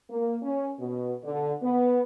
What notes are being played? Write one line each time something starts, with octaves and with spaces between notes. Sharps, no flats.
A#3
C#4
B2
D3
B3